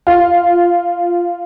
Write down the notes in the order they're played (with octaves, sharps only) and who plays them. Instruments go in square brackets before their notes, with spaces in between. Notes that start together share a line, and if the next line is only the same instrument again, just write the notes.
[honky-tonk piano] F4